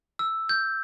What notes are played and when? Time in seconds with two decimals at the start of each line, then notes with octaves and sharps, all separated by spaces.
0.19 E6
0.49 G6